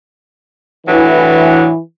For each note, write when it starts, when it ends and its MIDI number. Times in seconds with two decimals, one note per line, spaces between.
0.87 1.69 45
0.87 1.78 52
0.87 1.69 54
0.87 1.69 62